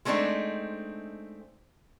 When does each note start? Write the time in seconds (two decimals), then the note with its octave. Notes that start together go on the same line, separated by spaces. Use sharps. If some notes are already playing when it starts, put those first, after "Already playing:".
0.05 G#3 A3 C4 D4 D#4